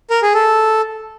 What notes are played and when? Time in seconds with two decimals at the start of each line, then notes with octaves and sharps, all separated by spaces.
0.10 A#4
0.22 G#4
0.34 A4